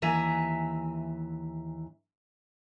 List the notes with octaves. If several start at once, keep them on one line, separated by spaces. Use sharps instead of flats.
D#2 E3 E5 G#5 A#5